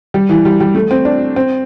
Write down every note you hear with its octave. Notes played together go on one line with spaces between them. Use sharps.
G3
E3
G3
G3
A3
C4
D4
C4